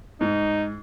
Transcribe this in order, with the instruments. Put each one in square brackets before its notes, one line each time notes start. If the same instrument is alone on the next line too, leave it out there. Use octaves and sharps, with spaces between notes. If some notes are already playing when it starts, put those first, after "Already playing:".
[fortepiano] G#2 [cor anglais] D#4